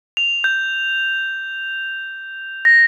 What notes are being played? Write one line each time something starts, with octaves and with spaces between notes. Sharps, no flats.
F7
G6
A#6